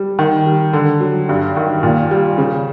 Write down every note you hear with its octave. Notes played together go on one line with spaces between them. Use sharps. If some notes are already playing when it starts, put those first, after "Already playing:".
Already playing: G3
D#3
G3
D3
F#3
G2
D#3
A#2
G3
C#3